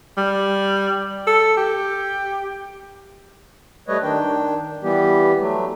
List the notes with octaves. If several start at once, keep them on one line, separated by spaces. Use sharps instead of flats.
G3
A4
G4
G3 A3 B4 C#5 D#5
D#3 D4 G5
E3 G3 B3 G4
F#3 A3